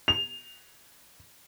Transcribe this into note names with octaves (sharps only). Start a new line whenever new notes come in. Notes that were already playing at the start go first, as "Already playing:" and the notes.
F7